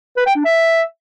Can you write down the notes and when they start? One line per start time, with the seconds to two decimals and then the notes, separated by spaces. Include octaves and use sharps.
0.17 B4
0.26 G5
0.36 D4
0.45 E5